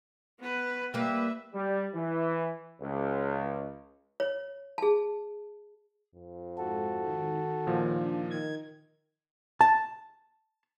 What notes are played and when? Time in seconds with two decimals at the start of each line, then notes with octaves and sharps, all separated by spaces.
0.40 B3 B4
0.94 G3 A#3 B4 E5
1.54 G3
1.95 E3
2.81 C#2
4.20 C#5
4.78 G#4 A5
6.15 F2
6.58 G#2 F#4 A4
7.01 D#3
7.67 D#2 A#2 F3
8.00 D4
8.31 D#3 G#6
9.61 A5